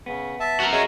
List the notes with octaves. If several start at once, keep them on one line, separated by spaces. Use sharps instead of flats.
C#3 B3
E5 A5
F#4 A#4
G#4 C#5 D#5 E5 A#5